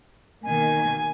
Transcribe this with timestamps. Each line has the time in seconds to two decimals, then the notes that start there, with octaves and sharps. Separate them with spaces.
0.43 B2 D#3 A#3 G#5